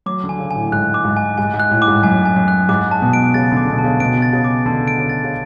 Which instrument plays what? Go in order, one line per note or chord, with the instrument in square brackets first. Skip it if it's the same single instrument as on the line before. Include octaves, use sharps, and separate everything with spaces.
[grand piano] F#3 [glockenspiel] D6
[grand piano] D3
[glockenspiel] G#5
[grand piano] C#3
[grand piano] A2 [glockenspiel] G#5
[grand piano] G#2 [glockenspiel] F#6
[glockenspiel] D6
[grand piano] G#2
[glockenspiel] G#5
[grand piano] G#2 [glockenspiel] G#5
[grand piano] G#2
[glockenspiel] F#6
[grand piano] A2
[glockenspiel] D6
[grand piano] G#2
[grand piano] F#2 [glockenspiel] G#5
[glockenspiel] G#5
[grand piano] F#2
[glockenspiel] F#6
[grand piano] G#2 [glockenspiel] D6
[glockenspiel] A5
[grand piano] B2
[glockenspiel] D7
[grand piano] C#3 [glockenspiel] A6
[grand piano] D3
[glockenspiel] D6
[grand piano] B2
[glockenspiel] A5
[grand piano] C#3
[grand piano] B2 [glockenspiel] D7
[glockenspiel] A6
[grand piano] C#3
[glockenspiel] D6
[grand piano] D3 [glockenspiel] A5
[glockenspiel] D7
[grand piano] C#3
[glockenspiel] A6
[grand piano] C#3